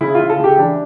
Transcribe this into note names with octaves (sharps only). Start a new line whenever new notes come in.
C#3 E4
F4
C#3
A4
C#3 G4
E3 D4